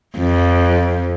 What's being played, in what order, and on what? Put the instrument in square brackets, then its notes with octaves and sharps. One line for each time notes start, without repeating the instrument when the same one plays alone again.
[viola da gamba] F2